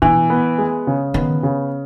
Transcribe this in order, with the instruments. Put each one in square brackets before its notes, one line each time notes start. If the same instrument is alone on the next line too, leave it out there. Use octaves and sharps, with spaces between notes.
[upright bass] B2 [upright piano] E3
[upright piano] B3
G#3
C#3
[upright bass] D#3 [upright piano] B3
[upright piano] C#3